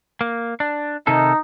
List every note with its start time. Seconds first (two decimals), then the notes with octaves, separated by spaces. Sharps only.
0.21 A#3
0.60 D4
1.07 C3 D#3 D#4 A4